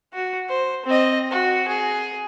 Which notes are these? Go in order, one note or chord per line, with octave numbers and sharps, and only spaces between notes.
F#4
C5
C4 D#5
F#4
G#4